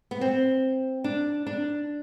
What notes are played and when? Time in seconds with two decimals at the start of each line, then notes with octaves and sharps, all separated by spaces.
0.11 B3
0.21 C4
1.04 D4
1.46 D4